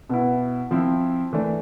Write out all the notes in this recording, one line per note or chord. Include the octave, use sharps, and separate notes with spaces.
B2 B3 E4
F3 C4 E4
E3 A3 D4